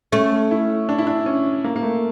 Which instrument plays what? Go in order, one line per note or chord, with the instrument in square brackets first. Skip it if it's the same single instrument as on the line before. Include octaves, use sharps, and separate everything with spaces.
[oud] A3 [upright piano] C#4
[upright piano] E4
D4
E4
D4
C#4
A#3
A#3
A3